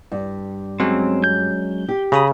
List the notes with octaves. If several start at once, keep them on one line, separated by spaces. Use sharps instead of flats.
G2
F#3 G#3 C4 C#4
G6
G4
C#3 A#5 B5 D#6